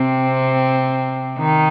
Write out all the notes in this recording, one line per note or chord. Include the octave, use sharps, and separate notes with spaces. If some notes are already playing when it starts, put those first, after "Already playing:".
Already playing: C3 C4
D#3 D#4